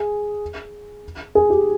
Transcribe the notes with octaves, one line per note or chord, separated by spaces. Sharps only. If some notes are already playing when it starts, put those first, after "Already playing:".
Already playing: G#4
G#4
G4